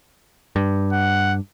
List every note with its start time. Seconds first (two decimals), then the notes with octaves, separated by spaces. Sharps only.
0.56 G2
0.92 F#5